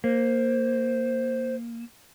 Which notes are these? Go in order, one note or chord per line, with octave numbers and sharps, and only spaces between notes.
A#3 C5